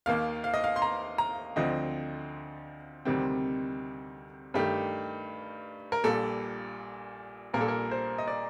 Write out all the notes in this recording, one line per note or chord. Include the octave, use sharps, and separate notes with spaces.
D#2 D#3 A#3 F5
F5
D#5
F5
C6
A#5
A#5
D2 D3 F3 C4 D#5
D2 C3 D#3 G3 C4
G2 D#3 A3 G4
A#4
A#1 A#2 G3 A4
A#1 A#2 G3 A#3 A#4
A4
A#4
C5
D#5
D5